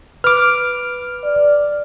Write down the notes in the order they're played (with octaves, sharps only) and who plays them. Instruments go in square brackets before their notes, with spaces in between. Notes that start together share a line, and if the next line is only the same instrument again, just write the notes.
[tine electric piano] B4 D6 [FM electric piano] F6
[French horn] D5